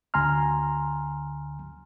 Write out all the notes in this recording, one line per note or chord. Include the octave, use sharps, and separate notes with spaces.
D2 D3 G#5 A#5 C6 F6